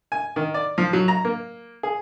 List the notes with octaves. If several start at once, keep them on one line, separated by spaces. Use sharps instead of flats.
G#5
D#3
D5
F3
F#3
A#5
A#3
G#4